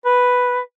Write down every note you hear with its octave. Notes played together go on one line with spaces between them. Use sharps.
B4